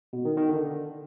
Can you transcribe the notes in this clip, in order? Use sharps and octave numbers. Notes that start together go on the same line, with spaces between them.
B2
D#3
D#3
D3